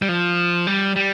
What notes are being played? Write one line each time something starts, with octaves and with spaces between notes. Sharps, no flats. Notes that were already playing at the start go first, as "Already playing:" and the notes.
G3
F3
G3
G3